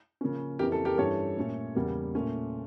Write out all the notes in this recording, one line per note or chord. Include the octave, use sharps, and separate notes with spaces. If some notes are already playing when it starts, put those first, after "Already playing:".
C#3 F3 A#3 C#4
F2 C#3 E3 A#3 C#4 G4 A#4
A4
G4 A#4
G2 E3 G3 C#4 A4 C#5
A#2 A3 C#4
E2 C#3 G3 A#3
A#2 A3 C#4